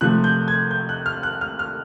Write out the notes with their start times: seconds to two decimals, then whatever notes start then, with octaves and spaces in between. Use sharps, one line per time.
0.01 C3 F3 A3 F#6
0.24 G6
0.48 G#6
0.71 G6
0.89 F#6
1.06 F6
1.23 F#6
1.41 F6
1.59 F6